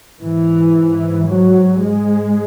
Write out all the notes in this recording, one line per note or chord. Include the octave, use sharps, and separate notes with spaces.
G#2 E3
F#3
G#3